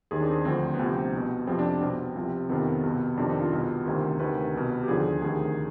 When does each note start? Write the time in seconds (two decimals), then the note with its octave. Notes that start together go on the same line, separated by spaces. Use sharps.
0.11 D#2 D#3 G#4
0.21 D4
0.28 C4
0.45 D2 D3 F3 C4
0.74 B3
0.79 D2 C3 F3 C4
1.13 C2 B2
1.47 F2 C3 F3 C4
1.59 D4
1.69 D4
1.81 C2 B2 C4
2.15 C2 C3 F3
2.49 F2 C3 D#3 B3
2.83 C2 B2
3.17 F2 C3 D#3 D4
3.29 D#4
3.40 F4
3.52 C2 B2
3.85 D2 C3 D#3
4.19 D2 C3 D#3 B4
4.54 C2 B2
4.83 G4
4.88 D#2 D3 F3 G#4
5.22 D2 C3 D#3 G#4